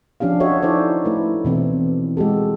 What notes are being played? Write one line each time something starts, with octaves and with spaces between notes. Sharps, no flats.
F3 C#4 D4 G4 F5
F#4 A4 C#5 D#5 E5
D#4 E4 A4 C5 D5
A3 E4 B4
B2 E3 C4
G#3 F#4 G4 A4